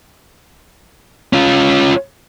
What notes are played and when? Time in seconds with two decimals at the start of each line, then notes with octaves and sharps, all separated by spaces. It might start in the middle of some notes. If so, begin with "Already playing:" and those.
1.33 C#4 F4